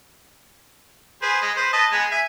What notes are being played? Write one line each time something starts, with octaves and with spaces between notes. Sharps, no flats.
G#4 B4 C5
G#3
B4 C5
B4 D#5 A5
G#3 B3 G#4
E5 G#5